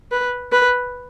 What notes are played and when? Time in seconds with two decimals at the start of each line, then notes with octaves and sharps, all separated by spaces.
0.12 B4
0.52 B4